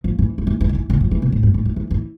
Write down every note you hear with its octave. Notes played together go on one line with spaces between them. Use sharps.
F3
E3
F3
E3
E3
D3
E3
D3
F3
E3
B2
A2
G2
A2
F3
E3
E3